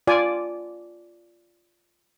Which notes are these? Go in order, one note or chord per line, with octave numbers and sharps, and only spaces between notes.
F4 D5 G#5